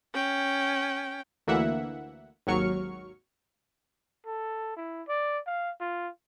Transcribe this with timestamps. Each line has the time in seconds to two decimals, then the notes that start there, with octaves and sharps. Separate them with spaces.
0.14 C#4 G5
1.47 D2 E3 A#3 E5 F#5
2.47 G#1 D#2 F#3 C#6 F6 C#7
4.26 A4
4.77 E4
5.08 D5
5.47 F5
5.80 F4